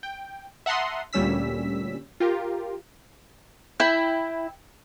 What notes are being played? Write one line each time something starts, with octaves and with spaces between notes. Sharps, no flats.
G5
E5 F#5 A5 A#5 C6 D#6
D2 A#2 G3 C#4 E6 B6
F4 G4 A#4
E4 G5